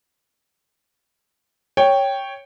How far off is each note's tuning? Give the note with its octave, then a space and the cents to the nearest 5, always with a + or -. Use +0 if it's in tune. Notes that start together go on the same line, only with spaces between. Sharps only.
C#5 +0 G5 +0